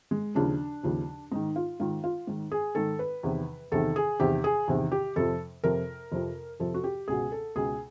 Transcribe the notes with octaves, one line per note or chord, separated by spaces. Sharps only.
G#3
D#2 C#3 F3 D4
D#2 C#3 F3
G#2 D#3 D#4
F4
G#2 D#3 F4
F4
G#2 D#3
G#4
G#2 D#3 A4
B4
E2 C3 D#3
E2 C3 D#3 A4
G#4
E2 C3 D#3 G4
G#4
E2 C3 D#3
G4
F2 C3 F3 A4
F2 C3 F3 A#4
F2 C3 F3
F2 C3 F3 A4
F#4
G4
C#2 B2 G#4
A4
C#2 B2 G#4